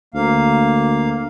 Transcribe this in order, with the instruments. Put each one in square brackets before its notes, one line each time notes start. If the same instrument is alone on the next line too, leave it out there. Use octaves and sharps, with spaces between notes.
[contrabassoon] D2 [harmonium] A#3 F5